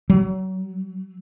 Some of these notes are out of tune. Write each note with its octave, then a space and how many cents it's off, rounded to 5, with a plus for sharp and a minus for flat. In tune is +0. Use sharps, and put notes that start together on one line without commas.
F#3 +30